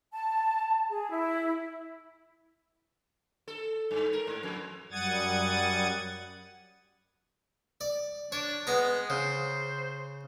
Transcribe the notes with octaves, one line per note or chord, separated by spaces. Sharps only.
A5
G#4
E4
A4
G2
A#4
G#2
F2
F#2 G3 F#5 D#6 G#6 A6
D5
D4 C#5
G#3 B3 A#5
C#3 C5